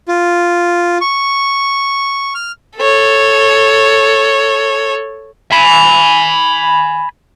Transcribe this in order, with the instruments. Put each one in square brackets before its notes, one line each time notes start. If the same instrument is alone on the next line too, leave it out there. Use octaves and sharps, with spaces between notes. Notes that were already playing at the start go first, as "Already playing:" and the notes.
[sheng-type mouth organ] F4
C#6
F6
[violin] A4 C#5
[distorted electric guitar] G#5 B5